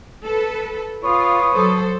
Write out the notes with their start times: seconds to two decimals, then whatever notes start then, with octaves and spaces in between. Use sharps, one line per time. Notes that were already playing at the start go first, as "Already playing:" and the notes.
0.26 A4 B4
1.04 F4 B4 C#5 D#6
1.54 F#3 A4 C5